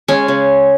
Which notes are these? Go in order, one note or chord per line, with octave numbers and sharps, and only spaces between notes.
G#3 C#4
C#3